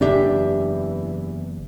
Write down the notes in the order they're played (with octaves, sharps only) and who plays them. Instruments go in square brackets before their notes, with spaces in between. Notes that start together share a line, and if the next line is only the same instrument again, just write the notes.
[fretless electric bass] F#1 D4 [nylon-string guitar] E2 G4 E5 [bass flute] E3